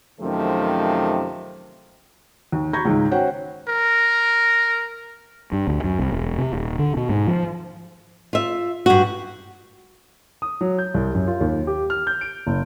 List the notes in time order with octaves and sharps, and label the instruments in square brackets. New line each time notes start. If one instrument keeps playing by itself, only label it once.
[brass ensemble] F#2 C3 D#3 F3 A3
[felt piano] D#2
A#5 B5 C#6 G6 G#6 A#6
C#2 G#2 D#3
C#4 F#4 C5 C#5 F#5 G5
[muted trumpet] A#4
[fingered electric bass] G2
D2
F#2
C2
E1
C3
D#1
D3
B2
G#2
F3
[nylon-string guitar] F4 E5
G2 F#4
[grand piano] D#6
F#3
G6
C2
F#2
F4
D#2
G4
F6
G6
D7
F#1